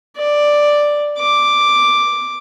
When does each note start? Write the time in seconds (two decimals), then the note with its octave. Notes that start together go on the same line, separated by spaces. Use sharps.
0.18 D5
1.18 D6